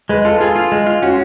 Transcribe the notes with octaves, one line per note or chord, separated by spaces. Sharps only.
G#3 B4
F4 A4
F4 G#4
F4
G#3
F4
C#4 F#4